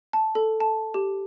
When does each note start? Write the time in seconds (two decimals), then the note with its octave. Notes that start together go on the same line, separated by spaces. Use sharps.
0.13 A5
0.35 A4
0.60 A5
0.94 G4